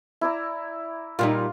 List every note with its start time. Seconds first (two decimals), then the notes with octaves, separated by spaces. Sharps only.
0.21 E4 D5 A#5
1.19 A#2 G3 D#4 F4